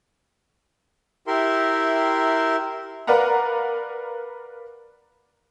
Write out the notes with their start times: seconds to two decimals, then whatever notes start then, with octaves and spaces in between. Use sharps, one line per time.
1.27 E4 G4 A#4 E5 C6
3.07 A#4 B4 D5 F5 F#5 A#5